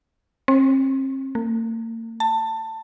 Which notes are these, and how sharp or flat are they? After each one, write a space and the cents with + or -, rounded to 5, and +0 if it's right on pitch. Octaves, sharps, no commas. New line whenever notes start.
C4 +40
A#3 -45
A5 +20